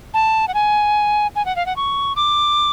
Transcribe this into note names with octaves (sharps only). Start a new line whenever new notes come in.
A5
F#5
G#5
G#5
F#5
F5
F#5
C#6
D6